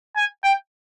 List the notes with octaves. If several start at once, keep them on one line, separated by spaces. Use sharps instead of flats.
G#5
G5